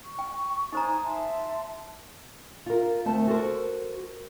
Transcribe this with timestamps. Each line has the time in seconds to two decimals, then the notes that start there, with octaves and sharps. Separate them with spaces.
0.04 C#6
0.19 G5
0.73 D#4 C5 G#5 A#5 D#6
1.03 E5 A5 C6
2.66 F4 A#4
3.05 D2 A3 C4 A5
3.27 F#4 A4 A#4 C5